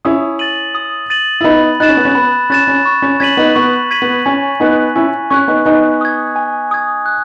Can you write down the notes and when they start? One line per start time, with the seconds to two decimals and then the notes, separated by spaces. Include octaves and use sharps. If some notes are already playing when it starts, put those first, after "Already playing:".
0.05 C#4 E4 D#6
0.39 A6 D#7 F#7
0.75 D#6
1.10 A6 D#7 F#7
1.41 E4
1.44 B3 D#4 B5
1.80 D#4 F#6 A6 E7
1.89 C#4
1.97 B3
2.05 C#4
2.15 B3 B5
2.50 C#4 F#6 A6 E7
2.68 C#4
2.85 C#6
3.02 C#4
3.20 C#4 G#6 B6 D#7 F#7
3.37 B3 D#4
3.55 B3 C#6
3.91 G#6 B6 D#7 F#7
4.02 B3
4.26 C#4 G#5
4.60 B3 D#4 C#6 F#6
4.96 C#4 E4 G#5
5.30 C#4 C#6 F#6
5.48 B3 D#4
5.65 B3 D#4 G#5
6.01 D#6 G#6
6.36 G#5
6.71 D#6 G#6
7.06 F#6